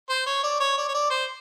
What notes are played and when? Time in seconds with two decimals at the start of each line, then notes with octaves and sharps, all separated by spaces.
0.10 C5
0.26 C#5
0.43 D5
0.60 C#5
0.78 D5
0.88 C#5
0.95 D5
1.10 C5